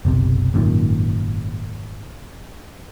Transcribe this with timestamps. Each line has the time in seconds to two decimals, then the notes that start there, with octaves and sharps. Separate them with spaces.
0.05 F#1 B1 C3
0.54 G#1 F#2 A#2 D#3